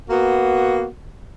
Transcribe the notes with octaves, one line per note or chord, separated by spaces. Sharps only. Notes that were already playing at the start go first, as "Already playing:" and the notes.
A#3 B3 F#4